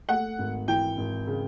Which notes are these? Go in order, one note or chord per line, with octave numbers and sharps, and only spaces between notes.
A3 F#5
G#1
E3 G5
G#1
C#3